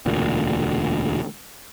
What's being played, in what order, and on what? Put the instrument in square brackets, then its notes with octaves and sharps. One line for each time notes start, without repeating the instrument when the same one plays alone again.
[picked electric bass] E1 D2 A#2